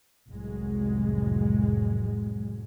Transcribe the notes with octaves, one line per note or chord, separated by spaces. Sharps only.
F1 C2 A2 F#3 G#3